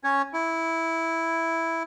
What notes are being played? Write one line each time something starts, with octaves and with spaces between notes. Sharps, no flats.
C#4 C#5
E4